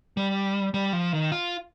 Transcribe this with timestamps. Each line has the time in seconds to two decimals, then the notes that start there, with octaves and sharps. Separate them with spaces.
0.17 G3
0.74 G3
0.93 F3
1.13 D#3
1.32 F4